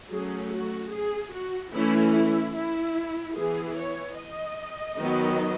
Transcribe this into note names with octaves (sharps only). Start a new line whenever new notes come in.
F#3 A3 C#4 G#4
F#4
G#4
F#4
E3 A3 C#4 E4
E4
E4
E3 B3 G#4
C#5
D#5
D#3 F#3 B3